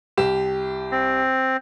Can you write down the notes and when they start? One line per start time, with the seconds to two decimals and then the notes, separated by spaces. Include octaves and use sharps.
0.17 C2 G4 E7
0.91 C4